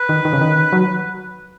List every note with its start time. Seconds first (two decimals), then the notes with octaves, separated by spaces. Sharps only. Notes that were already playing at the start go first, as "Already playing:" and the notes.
Already playing: B4
0.09 D#3
0.25 D#3
0.33 C#3
0.41 D#3
0.72 F#3